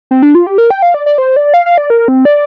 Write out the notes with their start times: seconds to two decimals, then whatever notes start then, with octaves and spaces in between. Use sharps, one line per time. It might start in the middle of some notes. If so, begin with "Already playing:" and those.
0.11 C4
0.22 D4
0.35 F4
0.47 G4
0.58 A#4
0.70 G5
0.82 F5
0.94 D5
1.06 D5
1.18 C5
1.36 D5
1.54 F5
1.66 F5
1.78 D5
1.90 A#4
2.08 C4
2.25 D5